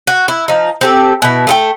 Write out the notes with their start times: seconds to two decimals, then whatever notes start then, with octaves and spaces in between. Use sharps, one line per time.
0.07 F#4
0.28 E4
0.48 F3 D#4
0.81 C4 G4 A4
1.22 B2 E4
1.47 A3 A4 G5